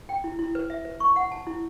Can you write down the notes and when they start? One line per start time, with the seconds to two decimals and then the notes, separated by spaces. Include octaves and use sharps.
0.09 G5
0.24 E4
0.39 E4
0.55 B4
0.70 E5
0.85 B4
1.00 C#6
1.16 F#5
1.32 A5
1.47 E4